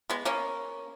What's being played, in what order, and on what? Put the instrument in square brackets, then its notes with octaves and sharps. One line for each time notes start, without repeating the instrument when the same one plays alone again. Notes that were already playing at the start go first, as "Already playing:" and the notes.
[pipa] G#3 B3
A#3 C#4